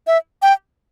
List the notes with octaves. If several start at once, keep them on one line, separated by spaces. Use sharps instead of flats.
E5
G5